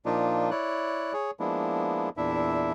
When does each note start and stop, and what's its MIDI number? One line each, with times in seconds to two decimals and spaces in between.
0.06 0.50 46
0.06 0.50 53
0.06 0.50 58
0.06 0.50 62
0.06 0.50 63
0.06 0.50 65
0.51 1.13 64
0.51 1.13 73
0.51 1.13 74
0.51 1.13 90
1.13 1.31 68
1.13 1.31 73
1.40 2.09 53
1.40 2.09 56
1.40 2.09 58
1.40 2.09 59
1.40 2.09 62
1.40 2.09 64
2.17 2.73 40
2.17 2.73 46
2.17 2.73 62
2.17 2.73 64
2.17 2.73 76